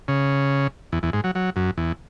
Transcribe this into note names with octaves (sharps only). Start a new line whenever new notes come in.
C#3
E2
E2
G#2
F#3
F#3
F#2
E2